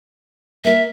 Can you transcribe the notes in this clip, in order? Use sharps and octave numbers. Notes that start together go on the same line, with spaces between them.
A#3 A#4 E5